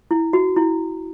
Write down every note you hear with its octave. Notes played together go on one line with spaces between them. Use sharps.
E4
F#4
E4